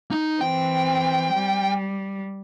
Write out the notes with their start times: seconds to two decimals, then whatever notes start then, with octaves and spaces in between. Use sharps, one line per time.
0.11 D#4
0.41 E3 C4 G5
1.33 G3